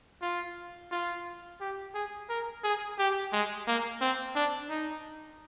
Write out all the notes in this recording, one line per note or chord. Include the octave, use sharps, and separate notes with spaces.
F4
F4
G4
G#4
A#4
G#4
G4
G#3
A#3
C4
D4
D#4